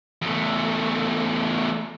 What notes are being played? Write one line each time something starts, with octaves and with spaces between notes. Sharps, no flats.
E2 A3